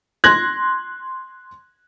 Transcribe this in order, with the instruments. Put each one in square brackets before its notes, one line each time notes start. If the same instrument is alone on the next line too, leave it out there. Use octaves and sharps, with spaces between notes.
[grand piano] C6 F#6 G#6 A#6 F#7